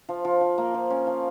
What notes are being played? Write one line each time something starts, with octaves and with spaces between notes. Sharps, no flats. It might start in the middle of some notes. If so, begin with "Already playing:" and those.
F3
F3
F3
A#3
F3
C#4
F3